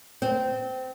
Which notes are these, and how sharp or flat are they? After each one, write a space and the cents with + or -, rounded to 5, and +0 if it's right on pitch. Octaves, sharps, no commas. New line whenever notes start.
C4 -20